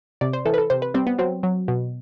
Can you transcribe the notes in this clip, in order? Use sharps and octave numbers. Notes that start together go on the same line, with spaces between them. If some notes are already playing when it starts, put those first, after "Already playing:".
C3 D5
C5
E3 A4
B4
A4
C3 C5
B4
G3 C4
B3
F#3 C4
F#3
B2